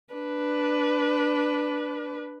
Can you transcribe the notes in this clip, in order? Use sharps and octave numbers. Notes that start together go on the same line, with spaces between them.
D4 B4